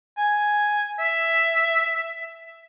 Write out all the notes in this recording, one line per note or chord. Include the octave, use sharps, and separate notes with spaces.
G#5
E5